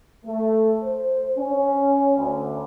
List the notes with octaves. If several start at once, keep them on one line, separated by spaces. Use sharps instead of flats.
A3
C5
C#4
D2